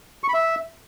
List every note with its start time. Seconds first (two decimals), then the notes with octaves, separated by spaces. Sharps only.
0.24 C#6
0.29 B5
0.34 E5